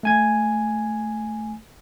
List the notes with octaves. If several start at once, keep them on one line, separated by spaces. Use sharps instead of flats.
A3 G#5 G#6